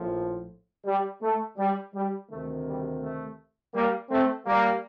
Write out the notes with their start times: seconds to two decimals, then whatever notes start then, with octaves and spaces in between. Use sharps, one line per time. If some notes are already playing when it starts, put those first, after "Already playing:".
Already playing: A#1 A2 F3
0.85 G3
1.22 A3
1.57 G3
1.94 G3
2.30 D2 C3 D#3 A3
2.66 G3
3.02 A3
3.74 G3 A#3
4.10 A3 C4
4.46 G3 A#3